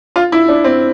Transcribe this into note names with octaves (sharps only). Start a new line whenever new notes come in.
F4
E4
D4
C4